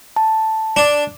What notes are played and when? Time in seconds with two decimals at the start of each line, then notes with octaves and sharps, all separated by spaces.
0.16 A5
0.76 D4